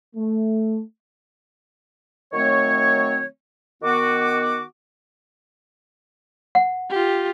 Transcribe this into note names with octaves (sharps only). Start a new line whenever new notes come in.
A3
D#3 F#3 A3 C4 C#5
D#3 B3 F#4 D6
F#5
F4 G4